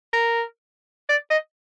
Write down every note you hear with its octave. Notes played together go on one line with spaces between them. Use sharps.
A#4
D5
D#5